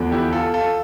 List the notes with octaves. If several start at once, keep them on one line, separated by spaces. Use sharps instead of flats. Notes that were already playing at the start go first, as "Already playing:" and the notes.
Already playing: E2 D3 F3
E4 G4
F4 A4
F4 A4